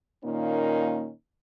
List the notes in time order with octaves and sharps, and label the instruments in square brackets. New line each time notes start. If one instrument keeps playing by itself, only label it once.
[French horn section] A#2 D#3 A#3 C#4 D#4